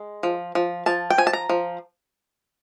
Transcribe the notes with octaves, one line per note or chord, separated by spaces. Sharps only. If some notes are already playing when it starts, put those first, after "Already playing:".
Already playing: G#3
F3
F3
F3 A5
G5
F3 G#5
A5
A#5
F3